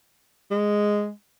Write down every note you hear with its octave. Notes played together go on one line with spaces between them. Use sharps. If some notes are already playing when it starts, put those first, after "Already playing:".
G#3